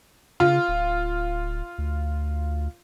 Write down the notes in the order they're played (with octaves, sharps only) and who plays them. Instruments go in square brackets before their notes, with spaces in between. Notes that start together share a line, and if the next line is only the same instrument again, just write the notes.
[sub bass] C#3 [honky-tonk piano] F4
[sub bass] D1
D2